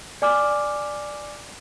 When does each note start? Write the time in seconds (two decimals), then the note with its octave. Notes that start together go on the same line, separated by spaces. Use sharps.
0.22 D5 G#5 D6 F6